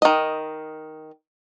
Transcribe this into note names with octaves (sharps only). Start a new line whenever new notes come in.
D#3 D#5